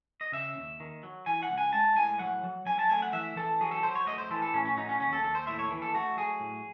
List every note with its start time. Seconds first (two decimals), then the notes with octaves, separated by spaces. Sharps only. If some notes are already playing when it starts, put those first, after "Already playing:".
0.21 D#5
0.32 C#3 E5
0.57 D#2
0.80 D#3
1.03 F#3
1.26 E3 G#5
1.43 F#5
1.50 C#2
1.58 G#5
1.73 G#3 A5
1.96 A2 G#5
2.19 F#3 F#5
2.44 F#3
2.66 F#3 G#5
2.79 A5
2.90 A3 G#5
3.02 F#5
3.13 E3 E5
3.36 E3 A4
3.61 F#3 G#4
3.71 A4
3.83 F#3 C5
3.95 C#5
4.07 A3 D#5
4.18 C5
4.31 E3 A4
4.42 A4
4.54 A2 C#4
4.65 C#4
4.77 F#3 D#4
4.89 C#4
5.00 D#2 C#4
5.13 A4
5.24 D#2 A4
5.35 C5
5.47 A2 E5
5.59 C#5
5.71 E3
5.82 A4
5.94 A3 F#4
6.17 F#3 G#4
6.40 A2